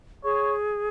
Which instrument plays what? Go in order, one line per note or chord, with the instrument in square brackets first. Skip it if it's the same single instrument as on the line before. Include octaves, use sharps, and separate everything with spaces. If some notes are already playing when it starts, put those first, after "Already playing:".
[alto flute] G#4 [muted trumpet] C#5